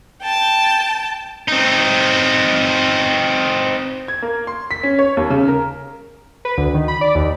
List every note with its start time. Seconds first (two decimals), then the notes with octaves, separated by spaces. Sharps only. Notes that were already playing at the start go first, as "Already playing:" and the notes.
0.22 G5 A5
1.48 C4 D#4
4.08 G#6
4.22 A#3
4.47 C6
4.71 B6
4.83 C#4
4.99 C#5
5.17 D#2
5.30 C#3
5.48 A#4
6.45 B4
6.57 D2
6.74 D#3
6.88 B5
7.01 D5
7.15 D#2